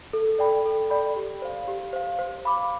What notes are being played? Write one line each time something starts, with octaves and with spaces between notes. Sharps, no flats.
A4
D5 G5 B5
A4
D5 G5 B5
G4
C5 F5
G4
C5 F5
C5
F5 B5 D6